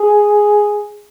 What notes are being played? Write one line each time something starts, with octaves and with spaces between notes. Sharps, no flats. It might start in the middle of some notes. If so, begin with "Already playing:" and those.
Already playing: G#4